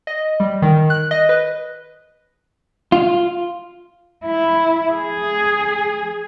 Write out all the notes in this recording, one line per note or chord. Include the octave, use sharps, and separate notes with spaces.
D#5
G3
D#3
F#6
D#5
B4
F4
E4
G#4